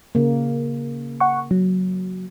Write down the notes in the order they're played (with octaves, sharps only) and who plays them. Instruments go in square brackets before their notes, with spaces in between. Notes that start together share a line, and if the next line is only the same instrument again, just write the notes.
[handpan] C#3 A#3
[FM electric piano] F#5 C#6
F#3